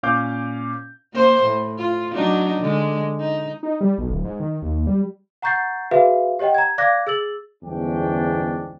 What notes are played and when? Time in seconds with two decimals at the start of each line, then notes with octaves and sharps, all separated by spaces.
0.03 A#2 C#4 F5 D6 G6
1.14 A#3 C5
1.43 A2
1.78 F4
2.13 F#3 D4 D#4
2.60 D3 G#3
3.20 D#4
3.63 D#4
3.81 G3
3.98 B1
4.10 D1
4.25 G#2
4.40 D#3
4.62 D#2
4.87 G3
5.42 F#5 A#5 C#6 G6 A6 C7
5.91 F#4 G#4 B4 E5 F5
6.39 G4 C#5 D#5 F#5 G5
6.55 A#5 G#6
6.78 D5 F5 D6 F#6 G#6 A#6
7.07 G#4 E6 A6 F#7
7.64 G1 E2 G#2 C#4 D4 G5